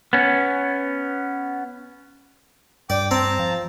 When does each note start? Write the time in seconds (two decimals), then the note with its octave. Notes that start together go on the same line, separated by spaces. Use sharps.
0.13 B3 C#4
2.90 G2 D5 G5 D6
3.11 C4 A5 A#5
3.39 F3